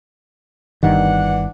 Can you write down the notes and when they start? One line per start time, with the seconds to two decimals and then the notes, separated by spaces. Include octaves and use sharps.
0.83 G1 G2 D#3 E3 D4 F#5